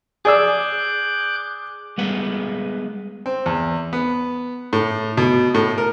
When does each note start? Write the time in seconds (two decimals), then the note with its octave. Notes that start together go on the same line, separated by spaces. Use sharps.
0.25 G#4 D5 D6 E6 F#6 G6
1.98 G3 G#3 B3 F#5
3.26 C4
3.46 E2
3.93 B3
4.73 A2
5.17 B2
5.55 A2
5.78 A#4